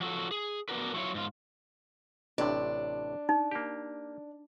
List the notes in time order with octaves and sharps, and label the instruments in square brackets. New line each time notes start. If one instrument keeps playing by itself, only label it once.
[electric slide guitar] F3 F#3 F#4 G#4 A4
G#4
B3 C4 D4 F#4 A#4 B4
F#3 E4 F4 C#5
G#2 F4
[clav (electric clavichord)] A1 A2 C3 [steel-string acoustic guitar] D4
[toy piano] D#4
[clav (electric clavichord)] A#3 G4